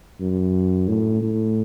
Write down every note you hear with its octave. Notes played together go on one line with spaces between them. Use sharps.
F#2
A2
A2